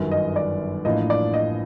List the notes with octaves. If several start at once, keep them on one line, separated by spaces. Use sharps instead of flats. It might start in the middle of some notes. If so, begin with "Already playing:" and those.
Already playing: G1 F#2 D#3
D#5
D5
A1 A2 F3 A#3 D4 D#5
D5
D#5